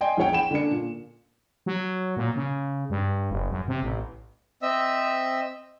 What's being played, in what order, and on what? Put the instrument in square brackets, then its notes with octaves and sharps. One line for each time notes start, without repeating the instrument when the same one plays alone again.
[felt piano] D5 D#5 G5 G#5 C6
A#1 E2 G#4 C#5 F#5 G5
G5 B5 E7
D3 A#3 C#4 D4 C#7
A#2
[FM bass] F#3
A#2
C#3
G2
F#1
F#2
C3
A1
[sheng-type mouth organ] C4 D#5 E5 E6